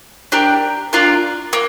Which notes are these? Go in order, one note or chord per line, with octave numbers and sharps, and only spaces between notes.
D4 G4 A#4
D4 F4 A#4
A#3